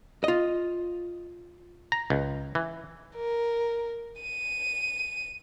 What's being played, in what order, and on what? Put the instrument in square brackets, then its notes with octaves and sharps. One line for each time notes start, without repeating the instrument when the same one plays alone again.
[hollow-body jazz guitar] F4 D#5
[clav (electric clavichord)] A#5
C#2
E3
[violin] A#4
D#7